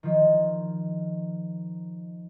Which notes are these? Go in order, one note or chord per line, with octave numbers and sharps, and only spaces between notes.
D#3 F3